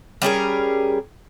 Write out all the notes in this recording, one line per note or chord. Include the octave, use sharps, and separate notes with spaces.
G3 C#4 G#4 A#4